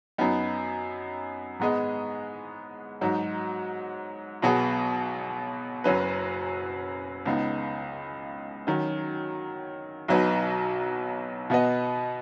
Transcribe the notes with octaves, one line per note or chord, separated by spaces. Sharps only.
F#2 F#3 B3 D#4
G#2 G#3 B3 G#4 D#5
G#2 F#3 D#4
B1 B2 F#3 B3 G#4
F#1 F#2 F#3 C#4 B4
C#2 C#3 B3 D#4
D#3 F#3 C#4
B1 B2 F#3 D#4 B4
B2 B3 F#4 B4 D#5